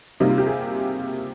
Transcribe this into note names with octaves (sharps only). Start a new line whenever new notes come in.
C3 G3 A#3 D#4
F4
G4
G#4